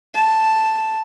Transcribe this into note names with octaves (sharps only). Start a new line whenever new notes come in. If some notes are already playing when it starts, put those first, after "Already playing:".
A5